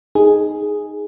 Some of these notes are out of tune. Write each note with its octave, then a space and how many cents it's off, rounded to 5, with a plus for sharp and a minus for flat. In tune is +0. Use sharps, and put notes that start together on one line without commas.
D#4 +0 G#4 +0